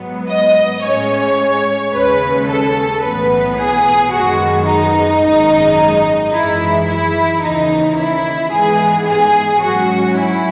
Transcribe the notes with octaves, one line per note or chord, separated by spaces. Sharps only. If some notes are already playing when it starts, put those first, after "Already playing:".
Already playing: G#2 F#3 B3
D#5
A2 G#3 C#4 C#5
D#2 C#3 G#3 C#4 B4
A4
B1 A2 E3 B3 B4
G#4
F#2 D#3 G#3 B3 F#4
D#4
G#1 F#2 D#3 G#3
F#2 E3 G#3 E4
E4
D#2 C#3 E3 D#4
E4
G#2 E3 G#3 B3 G#4
G#4
G#2 F#3 C#4 F#4
E4